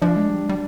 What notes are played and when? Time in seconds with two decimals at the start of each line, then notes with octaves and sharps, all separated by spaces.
0.01 F3 D4
0.16 G#3
0.28 G3
0.49 G3